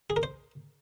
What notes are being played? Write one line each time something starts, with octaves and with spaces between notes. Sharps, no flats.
G#4
A#4
C5